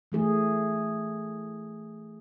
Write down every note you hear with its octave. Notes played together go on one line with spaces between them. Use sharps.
E3 A3 G#4